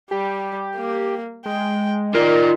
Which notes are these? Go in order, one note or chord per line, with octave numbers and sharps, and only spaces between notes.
G3 G4
A#3
G#3 G5
D#3 F4 A#4 D5